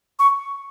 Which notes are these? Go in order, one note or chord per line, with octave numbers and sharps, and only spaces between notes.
C#6